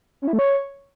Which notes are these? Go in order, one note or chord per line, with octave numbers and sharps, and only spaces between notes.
C#4
E4
A3
C#5